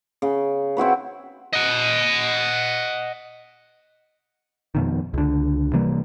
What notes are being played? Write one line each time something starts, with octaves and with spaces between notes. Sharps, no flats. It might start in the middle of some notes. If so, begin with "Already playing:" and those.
C#3
C4 E4 F#4 B4
D#5 F#5
F2 B2 D#3
C#2 D3
C3 E3 G3 A#3